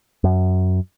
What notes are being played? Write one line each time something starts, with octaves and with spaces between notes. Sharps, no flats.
F#2